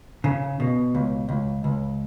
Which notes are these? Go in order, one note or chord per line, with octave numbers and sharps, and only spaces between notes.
C#3
B2
C#2
C#2
C#2